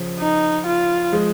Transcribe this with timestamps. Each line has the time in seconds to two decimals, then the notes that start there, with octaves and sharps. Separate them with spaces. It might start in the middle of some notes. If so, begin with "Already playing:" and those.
Already playing: C#3 F3
0.20 D#4
0.66 F4
1.13 F3 G#3